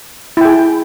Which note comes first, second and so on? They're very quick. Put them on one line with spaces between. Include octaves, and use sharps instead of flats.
E4 G5 G#4